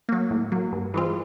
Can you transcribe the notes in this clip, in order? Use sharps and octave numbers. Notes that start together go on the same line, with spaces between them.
F#3 A#3
A2
F#3 A#3
G2
E3 G#3 C4 F4